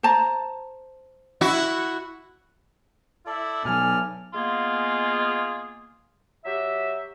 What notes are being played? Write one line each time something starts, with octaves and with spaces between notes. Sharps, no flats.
C5 A5 A#5
E4 F#4
E4 A4 D5
B2 F#3 G#5 F6
G#3 A#3 B3 F4 G#4
F#3 G4 E5